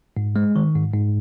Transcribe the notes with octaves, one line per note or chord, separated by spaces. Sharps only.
G#2
G#3
D#3
G#2
G#2